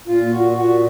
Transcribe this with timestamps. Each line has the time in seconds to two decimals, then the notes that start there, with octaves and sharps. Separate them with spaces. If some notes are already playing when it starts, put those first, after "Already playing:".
0.07 A#2 F4
0.30 A#2 F#4
0.53 A#2 F#4